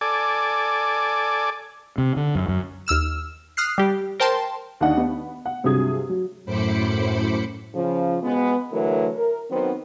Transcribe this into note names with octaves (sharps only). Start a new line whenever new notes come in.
A4 D5 G#5 D6
C3
D3
F#2
F#2
D#2 E6 F6 E7
D#6 F6 F#6 C7
G3 G4
A#4 C5 G5 A5 C6
D#2 D4 D#5 F#5
B3
F#5
G2 C3 F#3 G#4 D#6 G#6
F#3
F#2 A2 C5 B5 D6 C#7
C#3 F3
B2 G#3 B3
D3 E3 F#3 A3 A#4
A#4
D#3 F#3 B3 C4